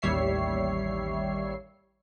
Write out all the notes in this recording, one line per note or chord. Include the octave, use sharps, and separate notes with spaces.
A1 D#2 G3 C#5 E5 C7